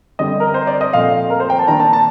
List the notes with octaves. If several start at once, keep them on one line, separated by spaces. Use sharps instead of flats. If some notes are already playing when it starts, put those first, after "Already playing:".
D3 G3 C4 D#5
A#4
C5
D5
D#5
A#2 F3 A3 C4 F5
A#4
C5
G5
A5
D#3 A#3 D4 A#5
A5
A5